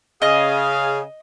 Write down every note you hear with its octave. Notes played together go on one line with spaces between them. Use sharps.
C#3 G#4 D#5 F5